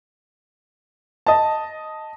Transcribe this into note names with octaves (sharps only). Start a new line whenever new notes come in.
D#5 A5